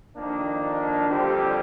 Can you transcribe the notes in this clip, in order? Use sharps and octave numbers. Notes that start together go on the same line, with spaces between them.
F2 D#3 A#3 D4
F2 D3 G3 C4 G4